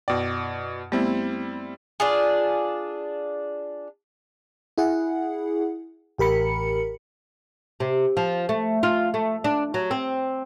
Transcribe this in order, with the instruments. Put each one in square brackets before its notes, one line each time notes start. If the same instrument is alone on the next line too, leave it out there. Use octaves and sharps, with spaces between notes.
[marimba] F#2 [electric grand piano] B2 D5
[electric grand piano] G3 C4 E4 [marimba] A3 B3
[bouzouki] D4 F4 G#4
[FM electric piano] E4 G#4 F#5
A1 G4 A#4 B5 C#7
[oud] C3
F3
A3
F4
A3
D4
F#3
C4